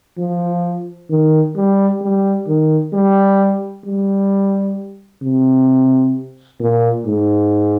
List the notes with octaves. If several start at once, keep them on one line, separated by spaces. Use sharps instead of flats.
F3
D#3
G3
G3
D#3
G3
G3
C3
A#2
G#2